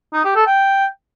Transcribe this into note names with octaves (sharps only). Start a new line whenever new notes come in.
D#4
G4
A4
G5